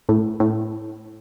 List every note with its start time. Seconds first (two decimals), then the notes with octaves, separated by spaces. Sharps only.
0.09 A2
0.40 A2